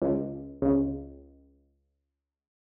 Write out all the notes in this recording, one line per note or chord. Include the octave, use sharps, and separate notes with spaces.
C#2
C#2